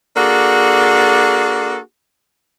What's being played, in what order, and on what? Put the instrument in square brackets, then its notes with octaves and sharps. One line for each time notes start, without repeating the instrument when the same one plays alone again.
[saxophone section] A#3 D4 F#4 G#4 A4